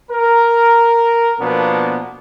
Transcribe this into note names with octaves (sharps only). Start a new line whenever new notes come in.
A#4
B2 F3 A#3 B3 D4